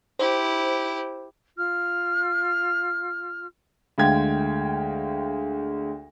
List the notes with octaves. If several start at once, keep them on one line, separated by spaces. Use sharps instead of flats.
E4 G4 C5
F4 F6
D2 G#3 F5 G5 G#6